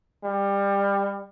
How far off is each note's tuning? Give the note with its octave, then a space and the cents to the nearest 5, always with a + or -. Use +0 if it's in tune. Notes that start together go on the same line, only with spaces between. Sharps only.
G3 +25